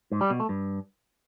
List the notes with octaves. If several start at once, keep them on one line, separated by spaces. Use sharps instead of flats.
G#2
G3
B2
A3
G2